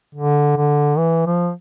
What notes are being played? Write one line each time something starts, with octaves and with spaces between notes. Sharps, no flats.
D3
D3
E3
F3